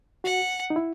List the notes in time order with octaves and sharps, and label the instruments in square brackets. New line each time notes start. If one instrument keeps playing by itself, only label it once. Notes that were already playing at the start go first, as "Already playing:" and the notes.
[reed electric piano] F#4 [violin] F#5
[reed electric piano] D#4
E4